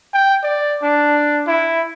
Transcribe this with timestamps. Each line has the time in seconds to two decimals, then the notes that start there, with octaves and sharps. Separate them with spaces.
0.14 G5
0.44 D5
0.82 D4
1.47 E4